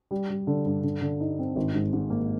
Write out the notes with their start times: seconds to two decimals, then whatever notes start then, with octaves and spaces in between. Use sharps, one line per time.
0.11 G3
0.30 G3
0.47 D3
0.66 G2
0.83 D3
1.02 D3
1.20 D#4
1.39 C4
1.56 G#1
1.75 G#2
1.93 G#2
2.10 A#3